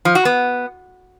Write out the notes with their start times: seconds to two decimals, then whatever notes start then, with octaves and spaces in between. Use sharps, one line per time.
0.05 F3
0.15 F#4
0.25 B3